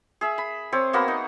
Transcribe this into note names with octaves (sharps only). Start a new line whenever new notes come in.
G#4 E5
B5
C4 C#5 D6
A#3 B3 F#4 A#4
D#4